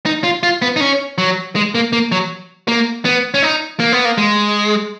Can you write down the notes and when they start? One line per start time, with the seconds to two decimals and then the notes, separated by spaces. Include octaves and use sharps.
0.06 D#4
0.24 F4
0.43 F4
0.62 B3
0.76 D#4
0.81 C#4
1.18 F#3
1.56 G#3
1.75 A#3
1.93 A#3
2.12 F#3
2.68 A#3
3.05 B3
3.34 C#4
3.43 D#4
3.80 A#3
3.92 B3
4.05 A#3
4.18 G#3